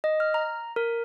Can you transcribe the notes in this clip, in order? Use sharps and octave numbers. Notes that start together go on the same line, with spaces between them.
D#5
F6
A#5
A#4